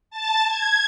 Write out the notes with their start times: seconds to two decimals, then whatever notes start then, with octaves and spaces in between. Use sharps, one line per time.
0.10 A5 A6
0.45 G#6